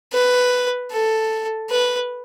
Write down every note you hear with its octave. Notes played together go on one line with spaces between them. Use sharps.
B4
A4
B4